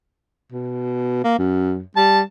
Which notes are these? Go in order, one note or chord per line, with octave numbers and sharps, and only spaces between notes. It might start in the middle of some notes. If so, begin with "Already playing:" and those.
B2
A#3
F#2
G3 A5